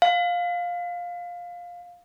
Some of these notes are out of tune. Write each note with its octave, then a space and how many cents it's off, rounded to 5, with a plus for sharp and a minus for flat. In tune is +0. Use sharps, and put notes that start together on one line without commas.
F5 +15